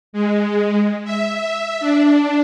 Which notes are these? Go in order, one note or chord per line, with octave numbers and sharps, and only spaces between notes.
G#3
E5
D4